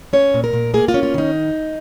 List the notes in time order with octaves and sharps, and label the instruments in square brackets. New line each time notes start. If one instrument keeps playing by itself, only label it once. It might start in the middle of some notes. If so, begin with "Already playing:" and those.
[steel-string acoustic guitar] C#4 C#5
A#2
A#4
A#2
A#3 G#4
F4
C#4
F4
D#3 D#4